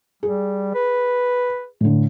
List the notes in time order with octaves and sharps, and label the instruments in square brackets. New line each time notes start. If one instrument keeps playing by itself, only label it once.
[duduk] G3 [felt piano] G#4
[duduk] B4
[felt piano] A2 D3